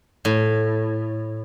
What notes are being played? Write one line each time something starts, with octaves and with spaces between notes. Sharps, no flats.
A2